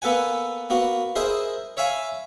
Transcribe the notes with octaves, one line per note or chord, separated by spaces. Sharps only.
A#3 B3 A4 B4 F#5 G#5
A#3 B3 F#4
E4 G#4 A#4 C5 D#5
C#5 E5 F5 G#5 B5